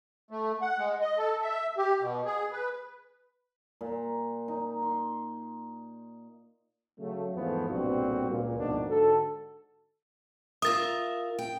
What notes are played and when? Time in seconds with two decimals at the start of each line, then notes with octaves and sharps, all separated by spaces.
0.31 A3
0.61 F#5
0.77 G#3
1.01 D#5
1.18 A4
1.42 E5
1.78 G4
2.00 B2
2.25 G#4
2.52 B4
3.81 A#2
4.48 D#4
4.82 C6
7.00 C#3 F#3 A3
7.35 E2 G#2 E3 F3 A3 B3
7.69 B1 G2 A#2 G3 C4 F#4
8.29 C#2 A#2
8.58 D2 G#2 B2 F3 A#3 D4
8.88 G#2 D3 F#4 A4
10.62 F4 A#4 E5 D#6 A6
11.39 G5